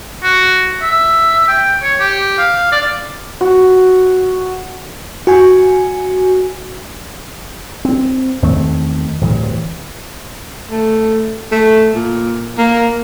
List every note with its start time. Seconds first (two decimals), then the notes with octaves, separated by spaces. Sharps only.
0.24 F#4
0.82 E5
1.48 G5
1.83 C#5
2.00 G4
2.38 F5
2.72 D5
3.41 F#4
5.27 F#4 G#5
7.85 C4
8.42 E2 D#3 A3 C4
9.21 D1 G2 E3
10.71 A3
11.51 A3
11.95 A#2
12.58 A#3